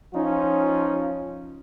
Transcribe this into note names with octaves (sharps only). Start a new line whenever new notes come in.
F3 C#4 D#4 F4